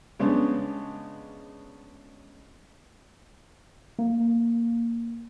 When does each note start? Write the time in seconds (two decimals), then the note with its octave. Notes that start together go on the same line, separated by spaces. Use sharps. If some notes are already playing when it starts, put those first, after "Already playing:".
0.19 C#3 G#3 B3 C#4 D4
3.99 A#3